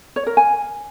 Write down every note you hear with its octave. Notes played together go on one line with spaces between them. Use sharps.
C#5
A#4
G#5